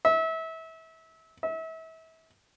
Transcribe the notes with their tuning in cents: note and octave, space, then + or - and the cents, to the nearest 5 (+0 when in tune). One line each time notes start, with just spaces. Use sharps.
E5 -30
E5 -35